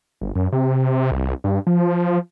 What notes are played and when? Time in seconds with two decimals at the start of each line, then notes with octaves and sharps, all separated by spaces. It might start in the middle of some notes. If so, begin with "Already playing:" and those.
0.21 G1
0.36 F#2
0.52 C3
1.11 C2
1.44 G2
1.67 F3